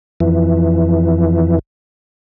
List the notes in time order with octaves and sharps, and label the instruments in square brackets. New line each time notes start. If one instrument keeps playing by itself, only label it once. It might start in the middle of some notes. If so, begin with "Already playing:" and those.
[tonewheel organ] F2 E3